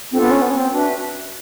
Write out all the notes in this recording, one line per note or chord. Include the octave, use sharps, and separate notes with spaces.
C4 D4 F4 A4
B3
C#4
B3
C#4
C4
D4 F#4 B4 E5